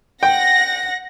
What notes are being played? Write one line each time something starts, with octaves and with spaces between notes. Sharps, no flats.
F#5 G5 A#6